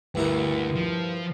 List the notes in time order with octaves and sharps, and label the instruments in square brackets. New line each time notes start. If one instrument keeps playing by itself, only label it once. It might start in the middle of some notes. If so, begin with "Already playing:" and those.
[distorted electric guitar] D2 [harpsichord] G2 E4 A#4
[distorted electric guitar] F3